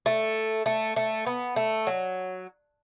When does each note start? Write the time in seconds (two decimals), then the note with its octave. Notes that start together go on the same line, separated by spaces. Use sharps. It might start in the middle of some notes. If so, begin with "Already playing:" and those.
0.06 A3
0.66 A3
0.96 A3
1.26 B3
1.56 A3
1.87 F#3